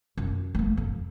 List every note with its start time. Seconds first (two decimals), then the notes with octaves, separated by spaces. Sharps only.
0.18 F#2
0.55 G#3 A#3
0.77 F2